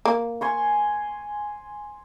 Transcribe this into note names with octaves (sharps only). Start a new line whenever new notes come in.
A#3
G#5 C6 C#6